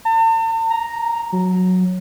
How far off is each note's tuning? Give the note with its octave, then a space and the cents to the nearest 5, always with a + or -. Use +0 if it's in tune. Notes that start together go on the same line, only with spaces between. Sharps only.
A5 +45
A#5 +0
F#3 -10